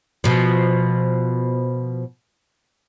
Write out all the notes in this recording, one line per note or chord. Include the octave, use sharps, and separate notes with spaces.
B2 F3